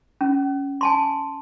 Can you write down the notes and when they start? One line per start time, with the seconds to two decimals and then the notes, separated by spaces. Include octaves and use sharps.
0.21 C#4
0.81 G#5 A5 C6